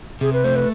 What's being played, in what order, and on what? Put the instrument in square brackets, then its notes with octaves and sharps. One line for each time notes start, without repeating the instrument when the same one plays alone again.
[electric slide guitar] C3 [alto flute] G#4
[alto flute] B4
[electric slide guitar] A3 [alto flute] C5
[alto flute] B4